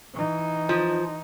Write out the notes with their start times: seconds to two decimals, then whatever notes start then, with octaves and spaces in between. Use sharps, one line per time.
0.14 E3 D#4
0.69 F3